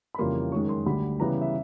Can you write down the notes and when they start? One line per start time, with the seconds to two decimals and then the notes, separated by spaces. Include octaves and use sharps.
0.15 B5
0.18 F2 C#3 E3 G3 A#3 C6
0.52 F#2 D#3 G#3 C#6
0.69 C6
0.86 D2 D3 G3 B5
1.20 C#3 E3 G3 B3 A#5
1.42 E5